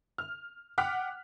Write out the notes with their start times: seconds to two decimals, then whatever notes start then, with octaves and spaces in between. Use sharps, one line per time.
0.18 F6
0.78 F#5 G5 D6 F6 F#6 B6